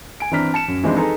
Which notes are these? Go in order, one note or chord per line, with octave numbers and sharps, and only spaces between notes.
G#5 D7
E3 C4 D4 A#5 F6 B6
A5 C#7 E7
F#2
E3 F3 G#3 C4 D4 D#4
D#4 G#4 A4 B4 A#5